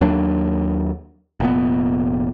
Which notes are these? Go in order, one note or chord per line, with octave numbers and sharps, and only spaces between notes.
D#2 F#3 A#3 D4
F1 A#2 B3